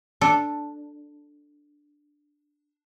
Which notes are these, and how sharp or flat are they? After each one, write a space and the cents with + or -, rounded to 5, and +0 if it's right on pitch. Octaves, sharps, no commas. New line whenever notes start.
D4 +0 A4 +0